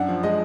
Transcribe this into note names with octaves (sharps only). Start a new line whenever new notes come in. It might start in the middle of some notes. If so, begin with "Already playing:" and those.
Already playing: F#2 D4 F#5
F3
G#3 D#5